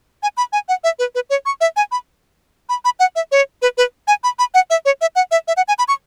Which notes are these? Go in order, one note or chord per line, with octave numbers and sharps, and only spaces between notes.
G#5
B5
G#5
F#5
E5
B4
B4
C#5
C#6
E5
G#5
B5
B5
B5
F#5
E5
C#5
B4
B4
G#5
B5
B5
F#5
E5
C#5
E5
F#5
E5
E5
F#5
G#5
B5
C#6